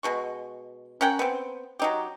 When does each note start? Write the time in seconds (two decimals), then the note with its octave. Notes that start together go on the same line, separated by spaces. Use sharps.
0.03 B2 G#3 C#6
1.01 C#4 A#4 F#5 G5
1.19 B3 C4
1.79 F#3 D#4 G4